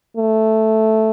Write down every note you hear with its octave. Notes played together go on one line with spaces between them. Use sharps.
A3